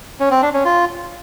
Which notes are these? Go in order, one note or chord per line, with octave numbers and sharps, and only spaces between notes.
C#4
C4
D4
C#4
F4